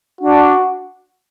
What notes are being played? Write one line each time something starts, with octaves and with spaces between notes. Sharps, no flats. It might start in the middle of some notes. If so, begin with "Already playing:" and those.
D4 F#4